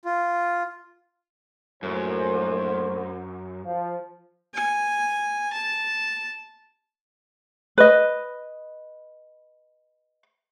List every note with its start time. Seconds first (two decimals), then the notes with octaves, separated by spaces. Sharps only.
0.05 F4
1.83 A#1 F#2 A2 C5
3.65 F3
4.54 G#5
5.53 A5
7.78 B4 D#5